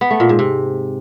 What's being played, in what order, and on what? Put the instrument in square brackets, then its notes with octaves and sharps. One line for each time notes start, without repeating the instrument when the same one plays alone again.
[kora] B3
A3
A#2
G#2
C3